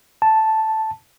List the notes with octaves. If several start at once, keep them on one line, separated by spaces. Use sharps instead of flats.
A5